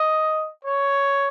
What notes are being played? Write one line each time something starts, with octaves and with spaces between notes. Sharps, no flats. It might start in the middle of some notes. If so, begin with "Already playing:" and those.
Already playing: D#5
C#5